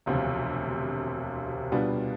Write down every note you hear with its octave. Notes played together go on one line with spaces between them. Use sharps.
E1 D2 C3 F3
B2 G3 B3 D4 F4